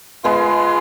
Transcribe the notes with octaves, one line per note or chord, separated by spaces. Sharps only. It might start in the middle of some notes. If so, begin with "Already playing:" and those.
G#3 B3 F4